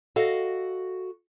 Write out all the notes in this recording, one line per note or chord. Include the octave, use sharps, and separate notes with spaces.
F#4 A4 D#5 F5